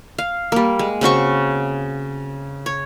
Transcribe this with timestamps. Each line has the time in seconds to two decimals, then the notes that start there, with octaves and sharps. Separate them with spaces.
0.18 F5
0.52 G3 A#3
0.79 G#3
1.01 C#3 C4 F#4 C#6
2.66 C#5